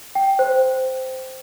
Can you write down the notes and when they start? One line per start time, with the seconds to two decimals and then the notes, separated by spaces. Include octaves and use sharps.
0.15 G5
0.39 C5